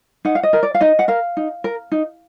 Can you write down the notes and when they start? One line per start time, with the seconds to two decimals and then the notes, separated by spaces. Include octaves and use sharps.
0.25 D#4 F#5
0.35 F5
0.43 D#5
0.53 A#4
0.63 D5
0.74 F5
0.81 D#4 D#5
0.99 F#5
1.08 A#4 F5
1.37 D#4
1.64 A#4
1.92 D#4